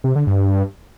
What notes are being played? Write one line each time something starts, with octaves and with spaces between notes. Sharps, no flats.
C3
D3
G2